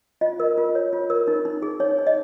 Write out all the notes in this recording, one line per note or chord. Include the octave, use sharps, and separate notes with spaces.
F4 D#5
A#4
F4
C#5
F4
A#4
D#4
D#4
G#4
D#4 C#5
D#4
D#5